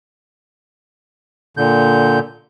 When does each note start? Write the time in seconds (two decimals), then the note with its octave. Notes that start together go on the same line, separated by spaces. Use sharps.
1.57 A#2 D3 G6